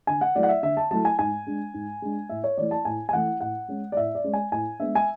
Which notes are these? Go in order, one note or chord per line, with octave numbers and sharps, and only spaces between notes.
D3 G#5
F#5
F#3 A3 E4 D5
F#5
E5
D3 E5
A5
F#3 A3 E4 A5
G#5
G#2 G#5
G#3 D4
G#2
G#3 D4
A2 E5
C#5
E3 A3 E4 D5
A5
A2 G#5
G#5
E3 A3 E4 F#5
A2 F#5
G#3 C#4
D5
A2 E5
D5
G#3 C#4
G#5
A2 G#5
G#3 B3 D4 E5
G#5